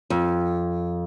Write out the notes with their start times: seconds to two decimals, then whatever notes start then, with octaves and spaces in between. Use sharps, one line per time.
0.10 F2